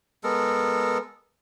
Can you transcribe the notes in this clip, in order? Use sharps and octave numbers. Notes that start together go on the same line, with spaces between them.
G#3 B3 A4 A#4